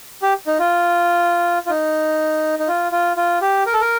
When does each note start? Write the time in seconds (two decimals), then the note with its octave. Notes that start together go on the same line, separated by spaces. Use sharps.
0.22 G4
0.47 D#4
0.59 F4
1.66 F4
1.70 D#4
2.59 D#4
2.68 F4
2.92 F4
3.17 F4
3.41 G4
3.66 A#4
3.73 A4
3.81 A#4